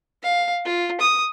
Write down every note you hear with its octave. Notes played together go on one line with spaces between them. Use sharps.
F5
F4
D#6